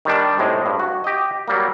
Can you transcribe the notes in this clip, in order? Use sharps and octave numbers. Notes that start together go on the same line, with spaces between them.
D#3 G3 D4
A2 C3 G#3
G2
F#4
G4 D#5
F#3 G3 A#3